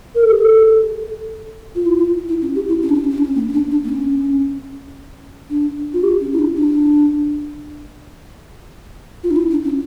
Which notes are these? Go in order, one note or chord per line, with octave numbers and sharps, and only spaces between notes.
A#4
A4
G4
A4
F4
E4
F4
E4
C#4
G4
E4
C#4
D4
C#4
D4
C#4
D4
C#4
A#3
C#4
D4
D4
A#3
C#4
D4
F4
G4
C#4
E4
D4
D4
F4
D4
E4
D4
C#4